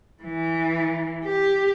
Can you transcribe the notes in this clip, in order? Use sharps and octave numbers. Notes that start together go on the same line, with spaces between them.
E3
G4